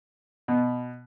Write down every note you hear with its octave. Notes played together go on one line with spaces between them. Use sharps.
B2